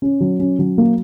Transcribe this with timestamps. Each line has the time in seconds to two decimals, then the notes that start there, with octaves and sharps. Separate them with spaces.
0.02 C#4
0.20 F#3
0.39 C#4
0.59 F#3
0.78 A#3